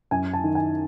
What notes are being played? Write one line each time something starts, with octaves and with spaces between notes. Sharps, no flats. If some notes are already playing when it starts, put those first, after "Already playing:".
F#2 G#5
A5
D#3
G#5